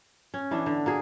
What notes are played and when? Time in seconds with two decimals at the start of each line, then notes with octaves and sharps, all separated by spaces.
0.34 C#4
0.51 E3 B3 D4 E4
0.66 D3
0.86 A#3 F#4 G#4